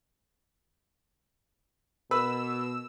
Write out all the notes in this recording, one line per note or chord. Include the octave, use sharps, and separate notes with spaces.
B2 A#4 B4 E6